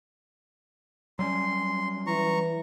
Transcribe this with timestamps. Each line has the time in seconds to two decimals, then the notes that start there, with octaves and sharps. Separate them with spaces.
1.19 F#3 G3 C#4 C6
2.07 E3 A#5 C#6